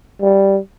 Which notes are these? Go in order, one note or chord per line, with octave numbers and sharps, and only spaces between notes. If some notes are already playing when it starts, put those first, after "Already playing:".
G3